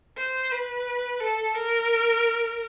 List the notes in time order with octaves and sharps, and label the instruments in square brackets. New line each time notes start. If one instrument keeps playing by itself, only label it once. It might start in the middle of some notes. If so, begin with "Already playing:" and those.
[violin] C5
B4
A4
A#4